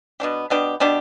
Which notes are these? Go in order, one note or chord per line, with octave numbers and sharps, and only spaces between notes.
B2 B3 D4 G4
B2 B3 D4 G4
B2 B3 D4 G4